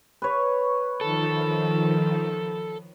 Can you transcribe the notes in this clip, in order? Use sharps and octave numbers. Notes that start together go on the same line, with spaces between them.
B4 C#5
D#3 F3 A4